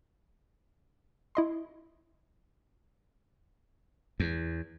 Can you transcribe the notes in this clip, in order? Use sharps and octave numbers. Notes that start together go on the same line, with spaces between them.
E4 D#5 C6
E2